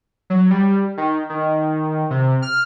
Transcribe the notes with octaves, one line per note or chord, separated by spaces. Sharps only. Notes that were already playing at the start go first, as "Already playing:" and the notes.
F#3
G3
D#3
D#3
C3
F6